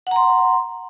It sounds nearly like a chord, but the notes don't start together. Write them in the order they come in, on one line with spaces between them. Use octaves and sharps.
F#5 A#5 C6